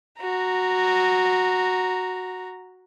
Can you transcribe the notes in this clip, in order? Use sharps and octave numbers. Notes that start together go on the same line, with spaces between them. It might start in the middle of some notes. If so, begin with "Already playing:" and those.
F#4 A#5